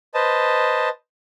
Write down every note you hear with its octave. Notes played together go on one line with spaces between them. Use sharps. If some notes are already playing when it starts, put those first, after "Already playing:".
B4 C5 D#5 A5